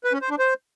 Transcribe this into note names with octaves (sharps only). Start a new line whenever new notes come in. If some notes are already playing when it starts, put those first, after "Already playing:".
B4
C#4
C5
D4
C5